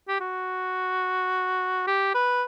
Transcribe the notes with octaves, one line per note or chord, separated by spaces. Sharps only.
G4
F#4
G4
B4